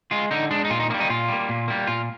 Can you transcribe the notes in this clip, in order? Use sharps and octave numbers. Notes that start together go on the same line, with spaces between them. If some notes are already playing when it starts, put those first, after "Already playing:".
G#3 F4
D3 D#4
G#3 D4
D#4
A#2 F4
D#4
G3 A#3 D#4
D#4
A#2 F4
G3 A#3
A#2
G3 A#3
A#2 F4